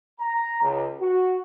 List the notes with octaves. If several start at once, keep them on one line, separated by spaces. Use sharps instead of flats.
A#5
C#2
F#4